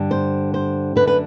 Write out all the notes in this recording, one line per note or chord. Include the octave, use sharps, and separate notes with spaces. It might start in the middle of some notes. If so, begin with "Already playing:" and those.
Already playing: G2 D3
C5
C5
F#2 D3 B4
B4